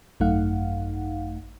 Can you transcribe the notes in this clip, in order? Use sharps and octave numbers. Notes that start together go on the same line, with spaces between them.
G#1 F#2 A3 D#4 F5 F#5